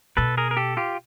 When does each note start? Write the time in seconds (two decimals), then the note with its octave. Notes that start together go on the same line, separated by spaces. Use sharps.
0.17 B2 A4 B4
0.37 G#4 A#4
0.51 A#4
0.57 G4 A4
0.77 F4 G4